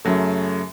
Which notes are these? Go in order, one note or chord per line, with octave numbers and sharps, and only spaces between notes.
F#2 C#3 F#3 A3